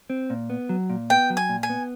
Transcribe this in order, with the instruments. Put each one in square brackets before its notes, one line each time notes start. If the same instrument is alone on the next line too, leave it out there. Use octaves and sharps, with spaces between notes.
[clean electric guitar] C4
A#2
B3
F#3
A#2
[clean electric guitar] B3 [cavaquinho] G5
[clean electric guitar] F#3
[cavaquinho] G#5
[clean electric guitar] A#2
[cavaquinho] G#5
[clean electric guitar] B3